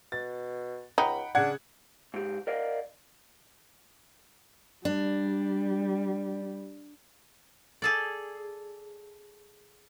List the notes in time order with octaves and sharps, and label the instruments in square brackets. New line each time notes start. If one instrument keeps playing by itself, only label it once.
[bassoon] B2 [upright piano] A6
[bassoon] C#2 [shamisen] D#4 [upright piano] F#5 G5 B5
[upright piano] C#3 G#6 [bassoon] D4 [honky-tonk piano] F#5
[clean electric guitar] G#2 G4
A#4 D5 D#5 F5
[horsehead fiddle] G3 [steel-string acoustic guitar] D4
[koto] G#4 A4 D5